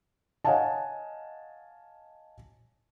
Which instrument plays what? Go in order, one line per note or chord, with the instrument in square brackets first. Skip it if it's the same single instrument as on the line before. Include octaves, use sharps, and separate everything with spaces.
[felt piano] C#5 D#5 F5 F#5 G#5 A5